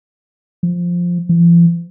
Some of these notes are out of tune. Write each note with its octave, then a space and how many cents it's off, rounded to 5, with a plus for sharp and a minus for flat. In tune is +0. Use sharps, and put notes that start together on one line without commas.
F3 +5
F3 -45